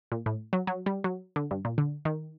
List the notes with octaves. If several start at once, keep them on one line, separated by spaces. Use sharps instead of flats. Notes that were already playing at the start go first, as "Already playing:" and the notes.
A#2
A2
F#3
F#3
G3
F#3
D3
G2
A#2
D3
D#3